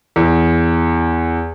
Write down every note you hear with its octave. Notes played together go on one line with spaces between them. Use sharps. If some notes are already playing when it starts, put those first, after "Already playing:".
E2